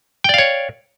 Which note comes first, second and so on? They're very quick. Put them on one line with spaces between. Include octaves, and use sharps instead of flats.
G5 D5 F5 C#5